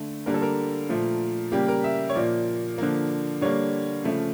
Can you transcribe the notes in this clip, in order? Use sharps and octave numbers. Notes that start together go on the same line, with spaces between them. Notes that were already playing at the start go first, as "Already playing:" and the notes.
Already playing: D3 A3
D3 G3 A#3 A#4
A4
A#4
A#2 F3 A3
C#3 G3 A#3 G4
A#4
E5
C#5
A#2 F3 A#3 D5
D3 F3 A#3
D3 G3 A#3 C#5
C#3 F3 A3